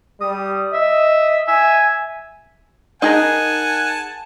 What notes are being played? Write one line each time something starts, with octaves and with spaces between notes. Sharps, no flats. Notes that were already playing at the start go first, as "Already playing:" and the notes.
G3 D#6
D#5 E5
E5 G#5
D#4 G#4 A#4 F#5 G#5 A5